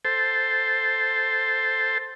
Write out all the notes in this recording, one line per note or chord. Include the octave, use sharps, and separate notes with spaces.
A4 C5